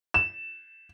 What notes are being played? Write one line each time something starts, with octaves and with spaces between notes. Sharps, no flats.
E7